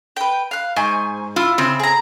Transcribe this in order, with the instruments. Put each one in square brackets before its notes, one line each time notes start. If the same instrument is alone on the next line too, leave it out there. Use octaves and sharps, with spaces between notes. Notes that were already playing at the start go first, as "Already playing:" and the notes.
[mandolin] B4 G5
F5 F#6
[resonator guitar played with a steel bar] G#2 [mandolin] C5 G#5 C#6
[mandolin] E4 [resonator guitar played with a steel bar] F4
[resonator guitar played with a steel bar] C#3 C4
[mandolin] G#4 A#5